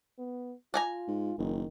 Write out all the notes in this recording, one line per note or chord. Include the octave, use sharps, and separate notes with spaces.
B3
D4 F4 G#5 A#5
G#2
F#1 D#3